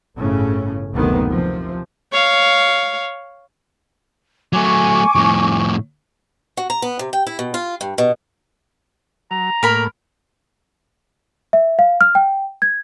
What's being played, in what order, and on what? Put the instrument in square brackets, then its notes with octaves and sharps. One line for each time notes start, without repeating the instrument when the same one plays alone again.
[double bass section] G1 A2 C#3 C#4
F#1 D2 C3 D#3 B3
C3 F3
[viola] C#5 F5
[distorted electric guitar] F#3 A3 [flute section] G#5 C#6 D6
[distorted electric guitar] F2 A2
[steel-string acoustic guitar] F#4
A#5
B3
C3
G5
E4
B2
F4
G2
B2
[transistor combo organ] F#3 [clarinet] A#5
[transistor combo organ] A2 A#3 [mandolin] A#4 B5
[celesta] E5
F5
F6
G5
G#6